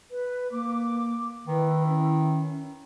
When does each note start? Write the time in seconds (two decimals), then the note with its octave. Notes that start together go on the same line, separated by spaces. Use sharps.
0.10 B4
0.51 A#3 D6
1.47 D#3 E4 B4
1.88 C#4